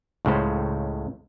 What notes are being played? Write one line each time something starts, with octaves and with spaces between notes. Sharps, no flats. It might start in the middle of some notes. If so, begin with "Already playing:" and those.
C#2 A2 C#3 C5